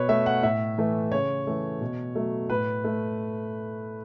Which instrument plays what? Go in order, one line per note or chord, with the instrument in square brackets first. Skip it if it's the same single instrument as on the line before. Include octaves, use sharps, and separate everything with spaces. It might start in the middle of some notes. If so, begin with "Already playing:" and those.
Already playing: [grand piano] B2 B4 C#5
A3 E5
F#5
A2 E5
E3 A3
C#3 C#5
E3 A3
B2
F#3 A3
A2 B4
A3